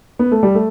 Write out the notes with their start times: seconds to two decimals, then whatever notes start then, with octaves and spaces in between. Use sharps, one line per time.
0.19 B3
0.31 A3
0.43 G3
0.55 A3